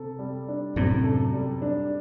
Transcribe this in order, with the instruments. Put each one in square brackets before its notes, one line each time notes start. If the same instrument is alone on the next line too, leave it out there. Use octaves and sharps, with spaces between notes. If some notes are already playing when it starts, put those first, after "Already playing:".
Already playing: [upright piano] C3 A4
G3
D4
[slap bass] F#2 A2 [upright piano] C3
[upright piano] A4
G3
D4